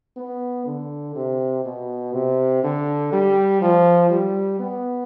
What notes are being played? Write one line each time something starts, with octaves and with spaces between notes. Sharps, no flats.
B3
D3
C3
B2
C3
D3
G3
F3
G3
B3